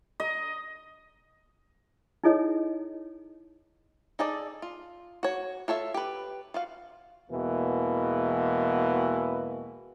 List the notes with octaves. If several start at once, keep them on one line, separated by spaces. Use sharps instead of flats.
D#5
D#4 E4 G#4 A4 C#5 D#5
D#4 G#4 A4 D5
F4
F#4 C#5
F4 A4 C#5 E5
G4 B4
F4 F#4 F5
E2 B2 E3 G#3 A#3